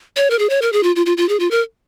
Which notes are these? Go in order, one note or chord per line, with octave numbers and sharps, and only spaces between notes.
C#5
A#4
G#4
C#5
A#4
G#4
F4
F4
F4
F4
G#4
F4
A#4